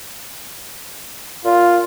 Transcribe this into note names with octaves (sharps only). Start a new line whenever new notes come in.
A#2 F4